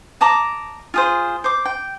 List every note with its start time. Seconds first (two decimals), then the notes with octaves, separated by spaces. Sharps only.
0.21 D#5 A5 A#5 D6
0.94 F4 G#4 C5
1.44 C5 D6
1.65 G5